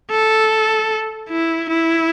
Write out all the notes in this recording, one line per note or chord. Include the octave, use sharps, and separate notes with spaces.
A4
E4
E4